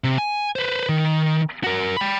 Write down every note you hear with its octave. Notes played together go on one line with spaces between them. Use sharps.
C3
G#5
B4 C5
D#3
F#4 A#4
G5 B5